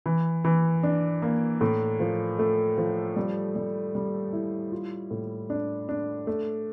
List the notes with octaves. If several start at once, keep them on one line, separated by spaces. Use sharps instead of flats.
E3
E3
D4
A#3
A2
F3
A3
F3
G3
G3
G3
E4
F4
A2
D4
D4
A3